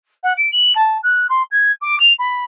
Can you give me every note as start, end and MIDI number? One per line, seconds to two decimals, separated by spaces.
0.23 0.33 78
0.37 0.49 98
0.52 0.72 102
0.75 0.98 81
1.03 1.27 90
1.29 1.42 84
1.51 1.72 92
1.81 1.98 86
2.00 2.12 101
2.19 2.44 83